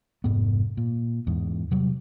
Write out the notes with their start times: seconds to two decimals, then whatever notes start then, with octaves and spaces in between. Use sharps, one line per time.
0.24 F1 G#2 B3
0.77 A#2
1.27 E2 G#2
1.71 C3 F#3 G3